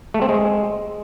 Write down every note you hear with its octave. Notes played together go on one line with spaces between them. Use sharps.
A3
C4
G#3